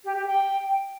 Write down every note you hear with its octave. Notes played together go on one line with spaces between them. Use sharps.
G4
G4
G5